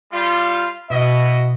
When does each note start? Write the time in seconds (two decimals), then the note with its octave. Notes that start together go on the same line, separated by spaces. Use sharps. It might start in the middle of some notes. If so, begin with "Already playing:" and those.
0.12 G3 F4
0.90 B2 E4 F#4 D#5